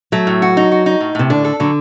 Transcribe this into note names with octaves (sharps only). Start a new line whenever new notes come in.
F#3 A3
A2
F#4
D#4
F#4
D#4
A2
A2 C3
D3 D4
A4
D3 F#3